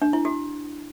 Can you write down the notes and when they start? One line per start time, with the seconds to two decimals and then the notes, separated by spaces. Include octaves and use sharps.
0.02 D4
0.13 E4
0.25 F#4